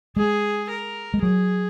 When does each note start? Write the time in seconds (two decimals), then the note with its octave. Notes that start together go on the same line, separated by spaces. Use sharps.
0.16 G#3 G#4
0.70 A#4
1.14 G#3
1.23 F#3 G#4